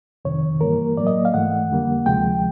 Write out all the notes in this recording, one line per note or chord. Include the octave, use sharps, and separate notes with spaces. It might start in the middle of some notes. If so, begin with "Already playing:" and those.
F2 C3 D#3 C#5
G2 E3 G3 A#3 A#4
A2 F#3 A#3 D5
D#5
F5
G#2 E3 A3 F#5
F2 D3 G3 A#3
D2 C3 F3 G#3 G5